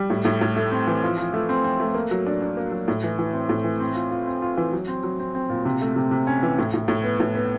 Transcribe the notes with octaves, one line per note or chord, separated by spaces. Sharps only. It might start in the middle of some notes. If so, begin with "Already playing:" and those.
Already playing: G3
A2
A2
A2
A3
C4
E3
F3
F3
A3
C4
C4
A3
A#3
F#3
D4
D4
A#3
F#3
A2
E3
E3
C4
A2
E3
C4
F4
F4
C4
F4
E3
F#3
C4
F#3
C4
C4
A#2
C3
A3
C3
C3
C#4
E3
A2
A2
A2
B3
A2
B3